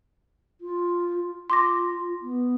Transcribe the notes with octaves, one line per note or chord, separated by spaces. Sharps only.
F4
F4 C6 D6 A#6
B3